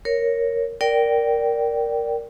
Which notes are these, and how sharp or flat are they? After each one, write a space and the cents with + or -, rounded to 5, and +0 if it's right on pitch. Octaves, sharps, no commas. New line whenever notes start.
A#4 +0 C#5 +0
A#4 +0 D5 -10 G5 -15